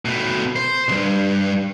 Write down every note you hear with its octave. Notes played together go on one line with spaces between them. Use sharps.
B2 A3
C5
C2 G2